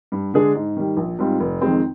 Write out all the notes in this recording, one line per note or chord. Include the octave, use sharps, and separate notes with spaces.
G2
D3 G#3 D4 G#4
G#2
D#3 G3
A#1
G#2 G3 C4 F4
F1
F2 D#3 G#3 C4